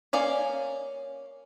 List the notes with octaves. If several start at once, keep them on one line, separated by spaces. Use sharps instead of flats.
A#3 C#4 D5 F5